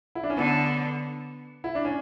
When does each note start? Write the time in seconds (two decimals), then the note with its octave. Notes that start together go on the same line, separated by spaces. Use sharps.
0.15 E4
0.23 D4
0.30 C#4
0.36 D3 B3
1.64 E4
1.75 D4
1.85 C#4